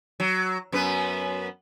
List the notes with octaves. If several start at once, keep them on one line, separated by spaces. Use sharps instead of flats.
F#3
F#2 B3 B4